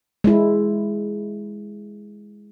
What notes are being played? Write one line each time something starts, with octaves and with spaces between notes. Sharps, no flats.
G#3 E4